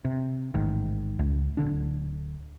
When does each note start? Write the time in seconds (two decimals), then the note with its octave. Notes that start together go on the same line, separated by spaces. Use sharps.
0.05 C3
0.54 A1 G#2 D#3
1.19 C#2
1.57 D1 C2 D3 D4